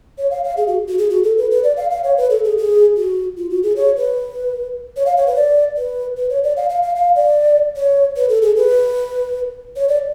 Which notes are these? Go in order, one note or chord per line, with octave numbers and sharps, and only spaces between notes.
C#5
F5
F5
G#4
F#4
F#4
G#4
F#4
A4
B4
B4
D5
F5
F5
C#5
B4
A4
G#4
G#4
F#4
F4
F#4
G#4
C#5
B4
C#5
F5
C#5
B4
D5
B4
B4
C#5
D5
F5
F5
F5
F5
D5
C#5
B4
A4
G#4
B4
C#5
D5